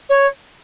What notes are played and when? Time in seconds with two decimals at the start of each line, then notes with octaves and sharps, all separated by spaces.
0.09 C#5